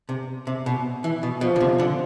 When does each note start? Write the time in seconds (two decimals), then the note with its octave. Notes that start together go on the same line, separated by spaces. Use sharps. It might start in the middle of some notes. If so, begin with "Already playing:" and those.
0.09 C3
0.47 C3
0.66 B2
1.04 E3
1.23 B2
1.41 B2 F3
1.56 D3
1.60 C3
1.79 D3